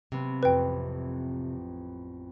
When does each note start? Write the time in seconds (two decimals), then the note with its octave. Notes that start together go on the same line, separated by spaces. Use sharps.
0.12 C3 F#3 B3 C4
0.43 A1 F2 B4 G5